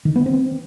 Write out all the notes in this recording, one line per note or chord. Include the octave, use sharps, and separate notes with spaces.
D#3
B3
C4